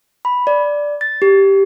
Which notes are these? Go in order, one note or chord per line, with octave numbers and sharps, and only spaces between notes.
B5
D5
A6
G4